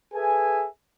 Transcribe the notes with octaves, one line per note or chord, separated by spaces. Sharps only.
G#4 A4 B4 E5 G#5